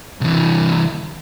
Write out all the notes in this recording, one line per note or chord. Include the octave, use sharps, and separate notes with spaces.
C2 E3